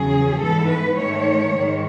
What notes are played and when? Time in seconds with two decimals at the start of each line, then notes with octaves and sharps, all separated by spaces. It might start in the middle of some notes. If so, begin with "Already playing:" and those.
Already playing: E2 C#3 F#3 G#4
0.41 G#2 E3 B3 A4
0.70 B4
0.97 G#2 D#3 A3 C#5
1.55 G#2 D#3 G#3